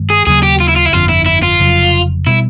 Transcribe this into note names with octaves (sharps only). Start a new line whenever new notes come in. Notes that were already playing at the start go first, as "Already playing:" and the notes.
Already playing: G2 D#3 G#3
G#4
D#2 C#3 F#3 A#3 G#4
G4
F4
E4
F4
E4
G1 F2 D3 F4
E4
E4
F4
F1 F2 C#3 F#3
B2 G3 E4